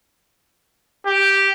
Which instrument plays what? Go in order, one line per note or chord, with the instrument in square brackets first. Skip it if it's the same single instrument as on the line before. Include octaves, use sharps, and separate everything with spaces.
[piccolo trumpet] G4